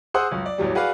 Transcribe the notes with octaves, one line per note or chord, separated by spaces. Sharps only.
G#4 C5 F#5 D#6 E6 F#6
C#2 F#2
D5
A1 E2 F#3 G3
F#4 G#4 B4 D5 F5